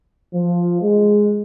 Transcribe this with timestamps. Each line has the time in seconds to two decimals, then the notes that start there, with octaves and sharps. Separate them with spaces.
0.33 F3
0.82 G#3